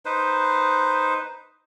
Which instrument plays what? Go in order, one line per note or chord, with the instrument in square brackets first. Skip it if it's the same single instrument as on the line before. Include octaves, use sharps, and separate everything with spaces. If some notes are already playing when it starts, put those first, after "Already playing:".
[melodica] D#4 B4 C5